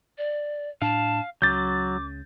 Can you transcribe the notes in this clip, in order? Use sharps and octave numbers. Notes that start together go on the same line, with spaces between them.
D5
A2 D4 F5 A5
C#2 C#3 F#3 D6 G6 A6